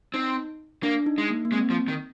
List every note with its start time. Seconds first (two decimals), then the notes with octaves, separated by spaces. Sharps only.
0.14 C4 D#4
0.83 A#3 D4
1.06 D#4
1.18 G#3
1.30 A#3
1.45 A#3
1.52 G#3 C4
1.70 F3
1.88 D#3